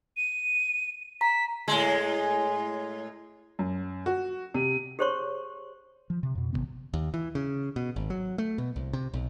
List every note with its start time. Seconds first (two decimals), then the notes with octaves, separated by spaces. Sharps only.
0.17 D#7
1.21 A#5 B6
1.68 A2 G#3
3.59 F#2
4.06 F#4
4.54 C3
4.99 G4 G#4 C5 C#5 C6 C#6
6.10 F3
6.23 C3
6.35 F2 B2
6.53 G#1 F#2 C3 B3
6.94 D#2
7.14 E3
7.35 C#3
7.76 B2
7.96 G#1
8.10 F#3
8.38 A3
8.58 B2
8.76 C2
8.93 C3
9.14 B1